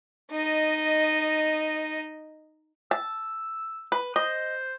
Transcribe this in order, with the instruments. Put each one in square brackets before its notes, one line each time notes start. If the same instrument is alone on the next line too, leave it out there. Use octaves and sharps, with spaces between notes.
[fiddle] D#4 D#5
[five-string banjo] A5 [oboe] E6
[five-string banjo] B4
[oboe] C5 [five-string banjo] D#5